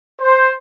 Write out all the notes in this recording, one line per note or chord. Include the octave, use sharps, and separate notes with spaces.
C5